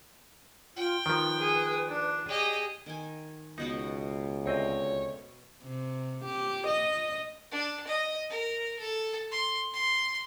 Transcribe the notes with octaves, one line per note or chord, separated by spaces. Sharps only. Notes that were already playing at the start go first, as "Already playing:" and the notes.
F4 G5
D#3 F3 B4
G#4
D4
G4 G#4 D#5
D#3 G5 G#5
C#2 B2 B3 D#4 F#4
D2 C4 C#5 D#5
C3
G4
D#5
D4
D#5
A#4
A4
C6
C6